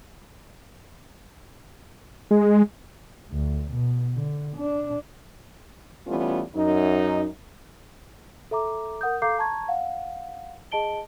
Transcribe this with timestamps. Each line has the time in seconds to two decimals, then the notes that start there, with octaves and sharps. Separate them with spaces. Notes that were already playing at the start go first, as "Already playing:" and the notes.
2.31 G#3
3.31 D2
3.72 B2
4.17 D3
4.57 D4
6.07 E3 G3 A3 B3 C#4 F4
6.55 F#2 D#4
8.51 A4 E5 A#5 D6
9.01 A#4 F#5 D#6 G6
9.22 A4 F5 A#5 D6 G6 C7
9.39 A5 A#5 C#6 G#6
9.68 F5 F#5
10.72 G#4 D#5 A5 D7 G7